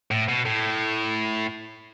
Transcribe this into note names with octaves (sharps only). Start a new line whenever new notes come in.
A2
B2
A2